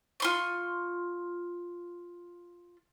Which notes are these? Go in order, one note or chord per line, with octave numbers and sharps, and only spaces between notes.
F4 C6 C#6